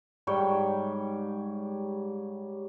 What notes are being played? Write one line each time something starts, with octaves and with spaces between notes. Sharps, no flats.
G#2 G3 C#5 G5